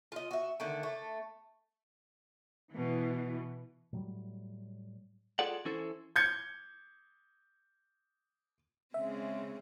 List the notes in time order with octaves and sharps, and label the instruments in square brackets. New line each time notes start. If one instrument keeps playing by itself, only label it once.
[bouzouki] F4 D#5
F#4 E5
D3 D#3 A3
A3
[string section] B2 E3
[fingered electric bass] A2 F#3 G3
[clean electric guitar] F4 G#4 A4 D5 F#5
E3 C#4 E4 A4 C5
[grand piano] G6 G#6 C#7
[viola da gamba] C#3 G#3 C4 [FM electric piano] E5